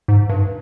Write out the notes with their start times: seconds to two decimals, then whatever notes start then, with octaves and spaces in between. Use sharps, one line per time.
0.08 G#2
0.29 G2